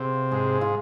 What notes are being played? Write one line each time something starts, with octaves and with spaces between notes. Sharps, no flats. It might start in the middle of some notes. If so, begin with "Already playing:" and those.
Already playing: C3 F4 G#4 B4
G#2 G#4
F4